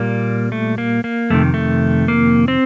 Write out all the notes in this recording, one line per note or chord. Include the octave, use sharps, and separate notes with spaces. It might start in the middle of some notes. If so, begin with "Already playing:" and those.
Already playing: A#2 G3 A#3
A3
A#3
A#3
F2 C3 D#3 A3
A3
A#3
C4